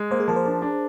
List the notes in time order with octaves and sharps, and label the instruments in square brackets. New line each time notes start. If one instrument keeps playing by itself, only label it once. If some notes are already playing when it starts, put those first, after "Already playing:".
Already playing: [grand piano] G#3
[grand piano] A#3 [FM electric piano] C5
[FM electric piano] G#4
[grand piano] F3 [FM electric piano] A#4
[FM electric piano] C5
[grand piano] D4 [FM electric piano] A#4
[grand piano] D4